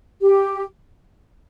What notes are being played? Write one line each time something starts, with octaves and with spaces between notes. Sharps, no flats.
G4